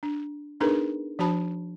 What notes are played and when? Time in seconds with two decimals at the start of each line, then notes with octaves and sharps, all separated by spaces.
0.03 D4
0.60 B3 D4 D#4 G#4 A#4 B4
1.19 F3 D4 F#4 C5 A5 B5